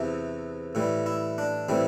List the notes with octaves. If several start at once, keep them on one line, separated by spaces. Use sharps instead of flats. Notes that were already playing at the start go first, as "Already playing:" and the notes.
Already playing: E2 C3 E3
A2 E3 G3
E4
D4
A2 E3 G3 C4